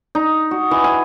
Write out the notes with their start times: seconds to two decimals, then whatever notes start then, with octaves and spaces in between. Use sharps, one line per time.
0.15 D#4
0.51 F#4
0.71 E3
0.84 G#5